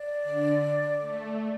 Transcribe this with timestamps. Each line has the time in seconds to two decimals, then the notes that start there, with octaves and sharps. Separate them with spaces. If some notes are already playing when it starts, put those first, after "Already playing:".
Already playing: D5
0.23 D3
0.99 A3